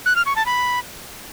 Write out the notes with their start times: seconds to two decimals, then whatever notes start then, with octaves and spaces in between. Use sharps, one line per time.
0.06 F#6
0.16 F6
0.26 C#6
0.36 A5
0.46 B5